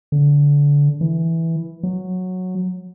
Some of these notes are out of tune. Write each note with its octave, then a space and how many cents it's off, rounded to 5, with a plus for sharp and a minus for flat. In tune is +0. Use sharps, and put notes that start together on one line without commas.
D3 -25
E3 -5
F#3 -10